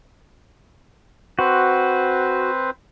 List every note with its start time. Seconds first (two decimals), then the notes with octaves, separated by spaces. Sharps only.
1.39 C4 F#4 B4 C5